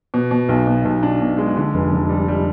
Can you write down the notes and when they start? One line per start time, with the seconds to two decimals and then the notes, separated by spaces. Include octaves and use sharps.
0.14 B2
0.31 B2
0.49 B1
0.67 B2
0.85 B1
1.03 D4
1.21 B2
1.38 G#3
1.57 D3
1.74 F1
1.92 F1
2.09 G3
2.28 G3